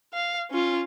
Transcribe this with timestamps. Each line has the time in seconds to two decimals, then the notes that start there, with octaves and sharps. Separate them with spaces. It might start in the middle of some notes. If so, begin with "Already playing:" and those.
0.14 F5
0.51 C#4 F4